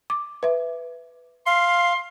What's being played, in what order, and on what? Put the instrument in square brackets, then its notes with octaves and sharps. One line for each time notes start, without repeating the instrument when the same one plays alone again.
[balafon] D6
B4 E5
[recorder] F5 [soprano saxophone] C6